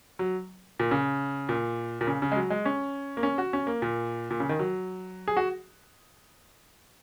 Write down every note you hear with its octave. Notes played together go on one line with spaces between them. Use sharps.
F#3
A#2
C#3
A#2
A#2
C#3
C#3
G#3
F#3
G#3
C#4
A#3
C#4
F#4
C#4
A#3
A#2
A#2
C#3
D#3
F#3
G#4
F#4